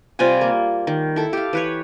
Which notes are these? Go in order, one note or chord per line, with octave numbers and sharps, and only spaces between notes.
C3 G3 F4 G#5
A#3
D#3
E4 A4
G4 F5
E3 B4 C#5